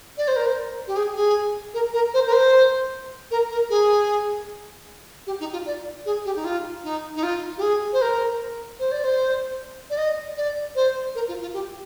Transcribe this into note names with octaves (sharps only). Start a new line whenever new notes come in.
D5
C5
A#4
C5
G4
G#4
G#4
A#4
A#4
C5
A#4
C5
A#4
A#4
G#4
G4
D#4
F4
D5
G#4
G4
D#4
F4
D#4
D#4
F4
G4
G#4
C5
A#4
C5
D5
C5
D5
D#5
D5
C5
A#4
F4
F4
G4